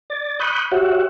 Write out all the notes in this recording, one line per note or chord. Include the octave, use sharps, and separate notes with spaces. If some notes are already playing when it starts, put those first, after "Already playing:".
D5 A6
B5 C#6 D#6 F#6 G6
F#4 G4 C#5 E5 F#5